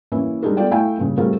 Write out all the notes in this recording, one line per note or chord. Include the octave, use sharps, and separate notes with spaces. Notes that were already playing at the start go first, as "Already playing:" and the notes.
E3 A#3 C#4 E4
G3 G#3 D4 D#4 G#4 A#4
B3 F4 A4 D5 G5
A3 E4 F5 G5 G#5
G2 A#2 C#3
G3 A3 C4 F4 G#4 A#4